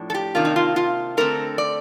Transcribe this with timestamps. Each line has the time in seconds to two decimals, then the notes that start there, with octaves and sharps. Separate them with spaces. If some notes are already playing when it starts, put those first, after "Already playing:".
Already playing: A2 F3 D4
0.10 A4
0.14 G4
0.35 C3 D#3 A#3 D4 F4
0.45 D#4
0.56 F4
0.76 F4
1.17 D3 A3 C4 A#4
1.58 D5